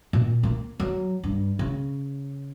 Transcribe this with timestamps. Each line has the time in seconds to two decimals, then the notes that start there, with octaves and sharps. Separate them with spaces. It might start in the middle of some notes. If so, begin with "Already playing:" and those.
0.13 A#2
0.43 A#3
0.80 F#3
1.24 G2
1.59 C#3